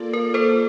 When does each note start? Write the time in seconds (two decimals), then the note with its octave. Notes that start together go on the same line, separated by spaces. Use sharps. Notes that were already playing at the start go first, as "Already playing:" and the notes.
Already playing: A#3 F4 A4 D5
0.13 A#4
0.34 A4 C5